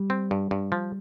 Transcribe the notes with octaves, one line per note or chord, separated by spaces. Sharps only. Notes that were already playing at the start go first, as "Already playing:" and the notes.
Already playing: G3
C4
G2
G2
F3